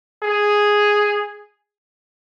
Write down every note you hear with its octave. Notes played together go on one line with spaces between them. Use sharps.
G#4